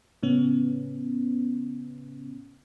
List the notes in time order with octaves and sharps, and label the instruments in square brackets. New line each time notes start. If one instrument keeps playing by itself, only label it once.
[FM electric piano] A2 C#3 B3 C#4